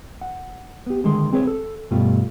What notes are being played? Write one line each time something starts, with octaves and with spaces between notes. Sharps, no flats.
F#5
B3 G4
D3 D#3 G#3 G#4 C6
C4 G#4 B4 C#5
A4
G2 B2 G3 A3 F4